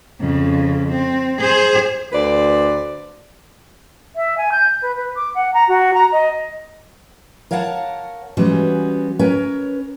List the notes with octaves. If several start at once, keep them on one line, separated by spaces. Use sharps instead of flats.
F2 C#3
C4
G#4 C5
D2 B4 C5 D5
E5
G#5
G6
B4
B4
D6
F#5
A#5
F#4
A#5
D#5
A#4 C#5 F5 F#5 G#5 A5
E3 G3 G#3 B3 C#4 F#4
C#4 A#4 B4 C#5